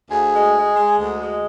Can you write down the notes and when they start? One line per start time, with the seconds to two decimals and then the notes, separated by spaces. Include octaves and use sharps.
0.10 D2 G#4
0.32 G#3
0.54 G#3
0.76 G#3
0.97 D2
1.18 G#3